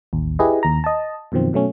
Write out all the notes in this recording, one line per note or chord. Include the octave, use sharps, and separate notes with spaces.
A1 D#2
E4 G4 G#4 B4 D#5
D#2 A#5
D#5 A5
F#2 B2 D#3 F3 C4
B2 F#3 A3 C#4